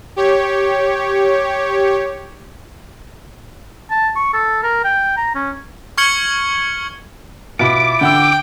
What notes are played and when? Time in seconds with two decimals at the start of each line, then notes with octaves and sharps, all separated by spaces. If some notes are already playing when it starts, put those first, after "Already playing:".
0.16 G4 C#5
3.90 A5
4.16 C#6
4.33 A4
4.63 A#4
4.84 G5
5.17 A#5
5.35 C#4
5.98 C#6 F6 G#6 C#7 F#7 G7
7.59 B2 E4 F4 D6
8.01 D3 F#5 G5 E6